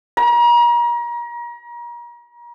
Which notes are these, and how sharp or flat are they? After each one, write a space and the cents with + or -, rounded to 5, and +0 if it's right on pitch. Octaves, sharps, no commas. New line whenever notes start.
A#5 +35